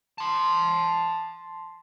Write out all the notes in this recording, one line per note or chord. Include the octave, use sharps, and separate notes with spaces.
A5 C6